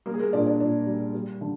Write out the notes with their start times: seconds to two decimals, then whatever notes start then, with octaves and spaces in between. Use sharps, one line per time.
0.06 G3 A#3 A#4
0.14 G#4
0.20 A#3 A#4
0.33 A#2 D4 D5
0.46 D4 D5
0.60 A#2 D4 D5
0.87 G3
1.14 G3
1.41 D3